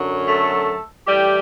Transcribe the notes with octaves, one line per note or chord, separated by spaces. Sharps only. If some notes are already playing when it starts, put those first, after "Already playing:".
Already playing: F#2 D3 F#3
A3 A4
A2 E3 G3 G4